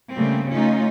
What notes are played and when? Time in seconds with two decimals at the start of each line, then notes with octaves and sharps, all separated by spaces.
0.13 C#3 G3 A3 A#3 C4
0.51 A3 C#4 D#4 F4